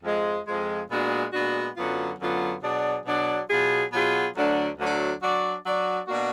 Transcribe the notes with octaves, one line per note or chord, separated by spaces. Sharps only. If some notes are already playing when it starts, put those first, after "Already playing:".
F2 F3 G#3
F2 F3 G#3
A#2 G#3 B3 D4 F#4
A#2 G#3 B3 D4 F#4
F#2 D3 F#3 B3 F4
F#2 D3 F#3 B3 F4
B2 F#3 D4 G#4 D5
B2 F#3 D4 G#4 D5
B2 F#3 B3 F4 G#4
B2 F#3 B3 F4 G#4
D2 D3 F#3 D4
D2 D3 F#3 D4
F#3 D4 F#4 D5
F#3 D4 F#4 D5
B2 A#3 D4 F#4